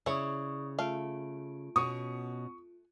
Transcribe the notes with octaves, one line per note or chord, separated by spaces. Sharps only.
C#3 E4 C#5 D5 C#6 D#6
A3 F4 F5 D7
B2 C#4 C#6 D#6